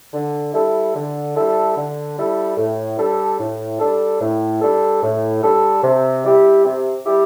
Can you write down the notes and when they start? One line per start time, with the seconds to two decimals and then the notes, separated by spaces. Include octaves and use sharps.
0.13 D3
0.54 G3 E4 A4
0.95 D3
1.35 G3 E4 A4
1.76 D3
2.17 G3 E4 A4
2.57 A2
2.98 G3 D4 A4
3.39 A2
3.80 G3 D4 A4
4.20 A2
4.61 G3 D4 A4
5.02 A2
5.42 G3 D4 A4
5.83 C3
6.24 G3 E4 G4
6.65 C3
7.06 G3 E4 G4